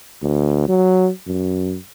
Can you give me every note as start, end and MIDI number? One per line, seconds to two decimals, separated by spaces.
0.22 0.64 38
0.68 1.10 54
1.27 1.77 42